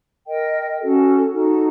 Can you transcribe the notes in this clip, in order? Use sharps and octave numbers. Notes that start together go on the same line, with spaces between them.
A#4 D#5 G5
C#4 F#4 A4
D#4 F#4 A4